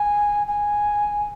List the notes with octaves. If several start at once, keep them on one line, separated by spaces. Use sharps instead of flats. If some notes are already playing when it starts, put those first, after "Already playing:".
Already playing: G#5
G#5